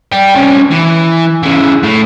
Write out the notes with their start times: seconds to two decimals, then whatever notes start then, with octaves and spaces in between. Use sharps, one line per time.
0.12 D5 G5
0.35 C2 C#4
0.71 E3
1.43 C#3 E3
1.83 A2